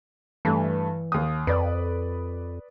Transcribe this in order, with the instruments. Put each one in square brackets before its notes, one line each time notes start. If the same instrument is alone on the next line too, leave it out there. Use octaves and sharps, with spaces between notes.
[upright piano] G2 A3 [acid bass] E3
[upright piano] D#2 D#6
[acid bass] F2 [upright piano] B4 D5